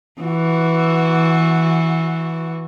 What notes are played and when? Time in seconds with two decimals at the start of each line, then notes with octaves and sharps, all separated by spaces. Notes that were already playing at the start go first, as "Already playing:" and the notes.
0.22 E3 F#4